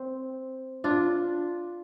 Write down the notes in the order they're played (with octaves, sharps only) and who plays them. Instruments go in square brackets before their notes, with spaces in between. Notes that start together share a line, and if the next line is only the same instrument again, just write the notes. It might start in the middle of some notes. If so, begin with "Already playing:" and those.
Already playing: [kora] C4
D4 F4